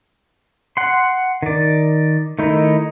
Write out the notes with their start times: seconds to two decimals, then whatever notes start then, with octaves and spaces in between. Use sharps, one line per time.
0.77 F#5 C6
1.42 D#3 D5
2.39 D#3 A3 D#4 E4